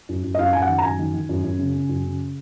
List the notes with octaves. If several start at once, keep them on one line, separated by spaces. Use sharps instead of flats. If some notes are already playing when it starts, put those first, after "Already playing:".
F#2
F#2
D#5
F#2 F5
F#2 G#5
F#5
D#3
A#5
F#2 G#5
D#3
D#3
F#2
F#2
C#3
C#3
F#2
C#3